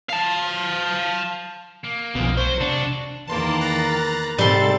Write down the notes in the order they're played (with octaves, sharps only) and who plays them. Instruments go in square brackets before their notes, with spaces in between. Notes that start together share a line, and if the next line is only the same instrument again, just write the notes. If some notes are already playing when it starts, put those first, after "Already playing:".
[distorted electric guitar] F5 A5
A#3
[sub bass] B1 [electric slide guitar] F2 B2
[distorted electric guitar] F#3 [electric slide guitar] C5
[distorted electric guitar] F2 F#4 [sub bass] C3 [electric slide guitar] D4
[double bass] E2 D#3 [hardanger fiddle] A#3 B4 [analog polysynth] A5 C6 D6
[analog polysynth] A#5 F#6 A6
[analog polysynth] G#2 A4 A6 [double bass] C3 [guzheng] G3 C6 [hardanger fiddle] G4